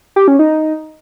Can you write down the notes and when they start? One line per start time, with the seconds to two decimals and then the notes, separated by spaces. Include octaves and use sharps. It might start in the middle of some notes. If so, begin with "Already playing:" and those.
0.16 G4
0.28 C#4
0.39 D#4